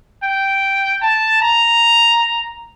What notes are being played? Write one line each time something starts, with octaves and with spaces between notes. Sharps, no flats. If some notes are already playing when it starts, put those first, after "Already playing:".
G5
A5
A#5